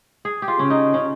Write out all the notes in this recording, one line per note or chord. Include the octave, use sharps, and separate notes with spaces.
G#4
G4
F4
C#3 C#4
D#4
C#4